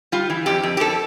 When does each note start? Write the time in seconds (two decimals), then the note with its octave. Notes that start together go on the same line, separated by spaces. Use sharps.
0.12 G3 F4
0.30 E3
0.46 F2 G4
0.63 F2
0.77 G4
0.80 F2 A4